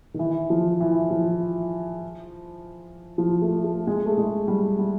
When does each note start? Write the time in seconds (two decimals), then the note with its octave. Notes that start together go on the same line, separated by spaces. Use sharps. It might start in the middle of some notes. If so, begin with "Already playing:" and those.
0.14 D#3
0.19 E3
0.50 F3
0.80 E3
1.11 F3
3.18 F3
3.42 A3
3.64 A3
3.87 G#3
4.06 A3
4.18 G#3
4.48 G3
4.79 G3